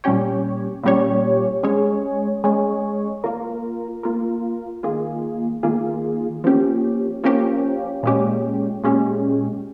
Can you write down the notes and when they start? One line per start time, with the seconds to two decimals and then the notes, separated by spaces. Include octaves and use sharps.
0.04 A#2 G3 C#4 G4 C#5
0.83 A#2 G3 C#4 G4 C#5
1.63 G#3 C#4 G#4 C#5
2.44 G#3 C#4 G#4 C#5
3.24 A#3 F4 A#4
4.03 A#3 F4 A#4
4.83 D#3 A#3 F4 G#4
5.63 D#3 A#3 F4 G#4
6.44 F3 A#3 C#4 G4
7.24 F3 A#3 C#4 G4
8.03 A#2 G#3 C#4 G4
8.84 A#2 G#3 C#4 G4